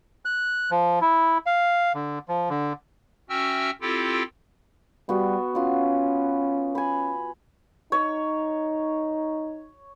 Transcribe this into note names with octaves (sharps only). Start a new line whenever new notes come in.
F#6
F3
E4
F5
D3
F3
D3
C#4 F#4 E5 G5 E6 F6
C4 E4 F4 G4 A4 G5
G3 B3 F#4
B3 C#4 F4
G#5 B5
D#4 C#5